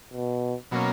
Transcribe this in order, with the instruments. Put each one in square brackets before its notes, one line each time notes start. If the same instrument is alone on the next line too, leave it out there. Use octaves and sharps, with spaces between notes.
[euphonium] B2
[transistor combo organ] B2 F#3 A#3 C#4